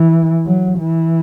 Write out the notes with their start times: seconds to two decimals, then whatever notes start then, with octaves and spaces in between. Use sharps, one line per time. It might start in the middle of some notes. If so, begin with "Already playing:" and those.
Already playing: E3
0.45 F#3
0.78 E3